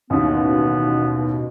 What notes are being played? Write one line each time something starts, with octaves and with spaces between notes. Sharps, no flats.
A1 D#2 B2 B3